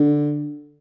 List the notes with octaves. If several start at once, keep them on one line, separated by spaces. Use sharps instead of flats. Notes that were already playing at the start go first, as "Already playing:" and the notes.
Already playing: D3